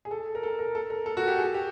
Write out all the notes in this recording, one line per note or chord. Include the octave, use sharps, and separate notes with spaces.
G#4
A4
A#4
A4
A#4
A4
A#4
A4
F#4
G4
G#4
G4